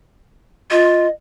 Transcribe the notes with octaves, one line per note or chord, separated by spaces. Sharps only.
F4 D#5